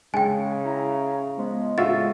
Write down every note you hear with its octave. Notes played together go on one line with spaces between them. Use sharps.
C#3 G#3 G5 G#5
E4 A#5
F3 G#3 B3
A2 C#3 G#3 F4 F#4 E5 A6